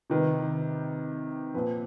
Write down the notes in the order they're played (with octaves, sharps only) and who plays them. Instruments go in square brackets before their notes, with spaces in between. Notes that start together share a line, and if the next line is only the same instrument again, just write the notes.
[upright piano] C3 D#3 B4
A#2 F3 B4